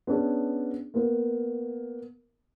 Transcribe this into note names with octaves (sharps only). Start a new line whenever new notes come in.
B3 C#4 D4 G#4
A#3 B3